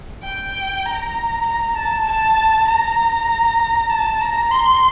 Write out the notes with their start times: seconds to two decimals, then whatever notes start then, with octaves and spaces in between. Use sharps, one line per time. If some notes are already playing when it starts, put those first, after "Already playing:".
0.24 G5
0.86 A#5
1.46 A#5
1.77 A5
2.07 A5
2.68 A#5
3.90 A5
4.21 A#5
4.51 C6